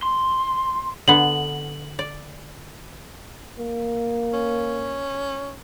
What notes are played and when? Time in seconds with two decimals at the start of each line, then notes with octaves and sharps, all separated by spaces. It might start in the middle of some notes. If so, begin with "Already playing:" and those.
0.03 C6
1.08 D3 B3 F#7
1.99 D5
3.58 A#3
4.33 C#4